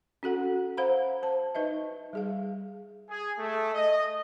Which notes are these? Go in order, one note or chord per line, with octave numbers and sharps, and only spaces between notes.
C#4 F#4 A4 F#5
C5 F5 F#5 A#5 B5
C5 A5
D#4 B4 D#5 E5
G3 G#4 F5
G#4
A3
D#5